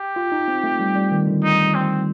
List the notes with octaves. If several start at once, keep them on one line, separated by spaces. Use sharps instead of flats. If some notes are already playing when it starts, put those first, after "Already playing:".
Already playing: G4
F4
D#4
C4
A3
G3
G3
D#3
D3
D#4
C4